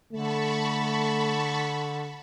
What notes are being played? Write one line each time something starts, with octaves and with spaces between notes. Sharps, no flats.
D3 A3 A5 B5 C#6